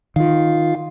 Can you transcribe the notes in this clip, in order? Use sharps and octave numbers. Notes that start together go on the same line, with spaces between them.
D#3 F4 F5